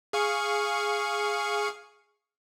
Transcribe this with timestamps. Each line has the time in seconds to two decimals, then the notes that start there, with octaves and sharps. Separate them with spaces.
0.13 G#4 F5 C#6